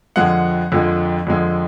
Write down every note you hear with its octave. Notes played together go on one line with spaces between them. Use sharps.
F2 D3 F3 G#3 F#5
F2 D3 F3 G#3
F2 D3 F3 G#3